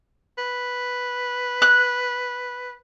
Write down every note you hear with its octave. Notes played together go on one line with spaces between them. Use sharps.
B4
F#6